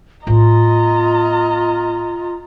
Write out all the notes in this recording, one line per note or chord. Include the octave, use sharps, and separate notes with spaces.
A2 B3 F4 D#5 A#5